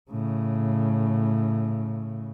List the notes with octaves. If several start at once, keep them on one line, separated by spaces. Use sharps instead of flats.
A2 C#3